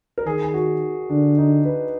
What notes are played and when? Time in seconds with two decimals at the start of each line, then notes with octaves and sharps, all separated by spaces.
0.18 A#4
0.26 D#3 G#4
0.42 G#4
0.54 F#4
1.10 D3 D4
1.38 D#4
1.65 B4